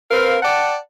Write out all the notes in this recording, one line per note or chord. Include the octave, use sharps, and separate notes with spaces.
C4 A#4 B4 F5
D5 F#5 G5 A5